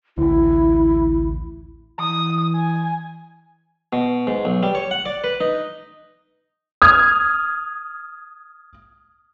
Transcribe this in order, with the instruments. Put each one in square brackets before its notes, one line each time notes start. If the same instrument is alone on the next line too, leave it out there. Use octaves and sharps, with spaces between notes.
[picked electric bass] A1 D2 [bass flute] E4
[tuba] E3 [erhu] D#6
[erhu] G#5
[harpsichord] B2
G#2
B1
G3
C#5
F#5
D5
B4
D#4
[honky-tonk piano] D#6 F6 G#6